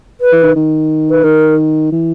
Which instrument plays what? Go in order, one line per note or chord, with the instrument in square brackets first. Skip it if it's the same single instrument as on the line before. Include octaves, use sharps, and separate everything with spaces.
[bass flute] B4
[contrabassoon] E3
D#3
D#3
[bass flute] B4
[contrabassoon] D#3 [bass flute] A#4
[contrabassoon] E3